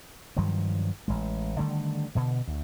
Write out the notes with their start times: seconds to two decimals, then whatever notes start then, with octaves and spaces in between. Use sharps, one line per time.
0.37 G2 D#3 F3 F#3
1.08 A1 G#3
1.59 D3 D#3 G3 A3
2.15 B2 D3
2.48 D2